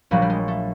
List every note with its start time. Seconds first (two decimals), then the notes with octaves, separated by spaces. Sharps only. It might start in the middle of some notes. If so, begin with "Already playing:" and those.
0.11 A#1 A#2 F#3 G3
0.22 G3
0.30 G#3
0.48 A3